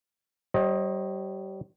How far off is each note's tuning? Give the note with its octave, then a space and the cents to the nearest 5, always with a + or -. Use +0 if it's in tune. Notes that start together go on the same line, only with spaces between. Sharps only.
G3 -30 C5 +40 D#5 +10